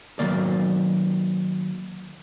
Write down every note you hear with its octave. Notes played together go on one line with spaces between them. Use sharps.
D#3 F#3 A#3 D5